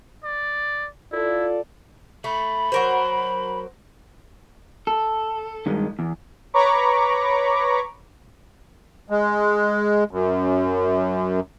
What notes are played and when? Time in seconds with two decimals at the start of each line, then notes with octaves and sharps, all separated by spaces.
0.24 D5
1.12 E4 F4 A4 D5
2.24 A3 B5
2.72 F#3 A#4 C5
4.87 A4
5.66 G2 D#3 G#3
5.99 E2
6.54 B4 C#5 A#5 B5 C#6 D6
9.10 G#3
10.11 F#2